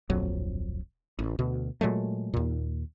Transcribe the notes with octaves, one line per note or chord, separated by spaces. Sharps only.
D1 A#1 F2 F#3
A1
D2 B2
A#2 F#3 G#3 A3
D#2 A#2